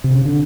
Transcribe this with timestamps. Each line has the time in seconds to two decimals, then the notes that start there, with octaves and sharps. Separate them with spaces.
0.04 C3
0.14 C#3
0.25 D3